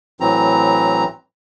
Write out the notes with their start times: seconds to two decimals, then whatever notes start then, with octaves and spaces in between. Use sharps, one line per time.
0.20 A2 E3 F#3 C4 A#5